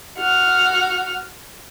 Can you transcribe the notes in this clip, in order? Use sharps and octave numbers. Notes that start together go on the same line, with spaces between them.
F#4 F6